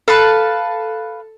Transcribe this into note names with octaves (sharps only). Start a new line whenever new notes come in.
A4 B4 F5 A5